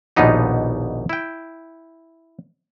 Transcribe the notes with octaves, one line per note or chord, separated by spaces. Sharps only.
A#1 D#2 B2 B3 D#4 G4
E4 G5